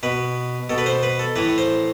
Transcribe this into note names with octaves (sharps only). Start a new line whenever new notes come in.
B2 B4
B2 A4
B4
C5
B4
A4
A2 E3 B4
C5